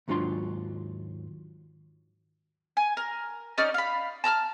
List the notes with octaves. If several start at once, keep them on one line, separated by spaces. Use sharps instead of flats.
D#2 G#2 F#3 D4 F4 C6
G#5
A#4
C#4 D#4 D5 F6
F5 B5
A5 A#5 E6 F6